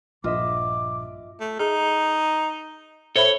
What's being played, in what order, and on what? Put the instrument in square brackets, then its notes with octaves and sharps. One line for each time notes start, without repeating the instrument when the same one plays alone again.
[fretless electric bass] A#1 [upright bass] G2 [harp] F4 D#5 E5 [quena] D6
[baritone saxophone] A3
[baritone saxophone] D#4 [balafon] G#4
[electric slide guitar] A4 C#5 [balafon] C5 E5 B5